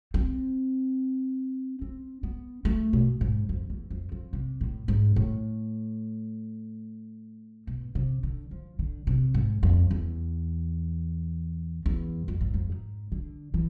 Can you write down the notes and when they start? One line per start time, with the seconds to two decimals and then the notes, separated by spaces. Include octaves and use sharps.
0.14 C4
1.82 C4
2.23 B3
2.65 A3
2.93 B2
3.21 G#2
3.49 F2
3.70 E2
3.90 F2
4.12 F2
4.33 C3
4.61 A2
4.88 G#2
5.16 A2
7.67 B2
7.95 C3
8.23 D3
8.51 F3
8.79 D3
9.07 C3
9.34 G#2
9.63 F2
9.91 E2
11.86 E2
12.28 F2
12.41 G#2
12.54 F2
12.70 G#2
13.12 D3
13.54 E3